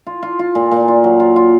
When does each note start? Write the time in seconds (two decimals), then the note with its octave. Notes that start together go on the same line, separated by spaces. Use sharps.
0.06 F4
0.23 F4
0.39 F4
0.55 A#2
0.71 A#2
0.88 F4
1.04 F#3
1.20 F4
1.36 F4